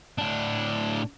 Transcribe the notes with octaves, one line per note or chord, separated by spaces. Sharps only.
A2 D4